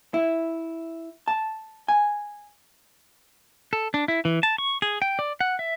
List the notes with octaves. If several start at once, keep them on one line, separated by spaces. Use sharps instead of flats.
E4
A5
G#5
A4
D4
E4
E3
A5
C#6
G#4
G5
D5
F#5
E5